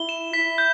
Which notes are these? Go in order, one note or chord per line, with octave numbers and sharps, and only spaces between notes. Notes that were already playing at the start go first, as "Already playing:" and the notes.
Already playing: E4 G7
E7
E4 B6
G6